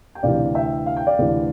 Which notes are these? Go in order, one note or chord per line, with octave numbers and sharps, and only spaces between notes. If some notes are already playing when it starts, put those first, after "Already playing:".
G5
D2 C3 E3 D5 F5
E5 G5
F5
G5
D5 F5
D2 C3 E3